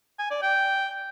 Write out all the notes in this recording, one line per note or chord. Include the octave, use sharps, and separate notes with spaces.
G#5
D5
G5